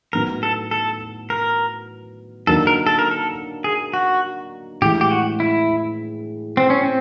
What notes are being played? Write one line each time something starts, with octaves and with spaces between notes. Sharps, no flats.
A2 F#3 B3 D#4 A#4
A4
A4
A#4
D3 F#3 A#3 D#4 A4
A#4
A4
A#4
A4
G#4
F#4
A2 E3 G#3 G4
G4
F#4
E4
C4
C#4
C4